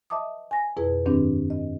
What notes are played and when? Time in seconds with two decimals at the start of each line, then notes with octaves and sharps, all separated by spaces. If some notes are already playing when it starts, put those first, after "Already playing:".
0.10 D#5 E5 A5 D6 D#6
0.51 G#5 A#6
0.77 F2 B2 E4 G#4 B4
1.06 G2 D#3 C4 D4
1.50 D#5